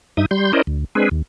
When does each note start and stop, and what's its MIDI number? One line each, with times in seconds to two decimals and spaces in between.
0.17 0.26 43
0.17 0.26 63
0.17 0.26 76
0.17 0.26 87
0.31 0.52 55
0.31 0.52 84
0.31 0.52 91
0.53 0.62 61
0.53 0.62 64
0.53 0.62 70
0.53 0.62 72
0.53 0.62 74
0.53 0.62 75
0.67 0.85 38
0.95 1.09 56
0.95 1.09 60
0.95 1.09 62
0.95 1.09 68
0.95 1.09 71
1.11 1.22 39